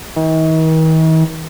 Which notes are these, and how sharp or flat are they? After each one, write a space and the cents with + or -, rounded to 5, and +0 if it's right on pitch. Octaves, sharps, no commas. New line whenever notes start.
D#3 +45